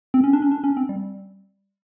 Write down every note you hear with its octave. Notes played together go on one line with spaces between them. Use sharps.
C4
C#4
D4
C#4
D4
C#4
C4
G3